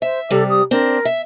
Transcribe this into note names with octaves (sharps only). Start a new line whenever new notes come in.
C5 E5
C3 G3 A4
D#6
C4 D4 A#4
E5